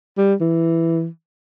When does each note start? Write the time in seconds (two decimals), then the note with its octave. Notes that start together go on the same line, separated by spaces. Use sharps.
0.17 G3
0.41 E3